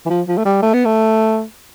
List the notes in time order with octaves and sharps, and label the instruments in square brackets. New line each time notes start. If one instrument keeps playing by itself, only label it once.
[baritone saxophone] E3
F3
F3
A3
G3
A3
B3
A3